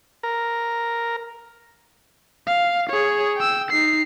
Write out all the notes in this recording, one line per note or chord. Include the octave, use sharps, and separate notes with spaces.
A#4
F5
G#4 C#5
G5 E6
D#4 C7